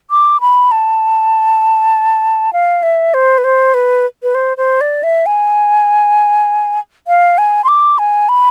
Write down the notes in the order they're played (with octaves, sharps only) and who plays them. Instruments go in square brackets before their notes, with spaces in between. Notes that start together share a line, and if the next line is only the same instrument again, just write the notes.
[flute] D6
B5
A5
F5
E5
C5
B4
C5
B4
B4
C5
C5
D5
E5
G#5
F5
G#5
C6
D6
G#5
B5